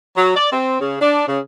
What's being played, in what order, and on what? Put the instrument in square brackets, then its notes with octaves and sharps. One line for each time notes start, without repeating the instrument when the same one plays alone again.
[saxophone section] F#3
D5
C4
C#3
D4
C#3